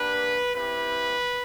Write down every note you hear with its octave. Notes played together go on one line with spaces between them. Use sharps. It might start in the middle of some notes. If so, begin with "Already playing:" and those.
Already playing: A#3 D4 G4 B4
C4 E4 G4 B4